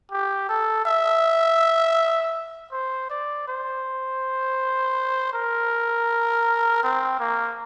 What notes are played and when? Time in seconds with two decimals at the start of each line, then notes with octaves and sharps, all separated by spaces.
0.11 G4
0.49 A4
0.85 E5
2.72 C5
3.10 D5
3.47 C5
5.33 A#4
6.83 C4
7.19 A#3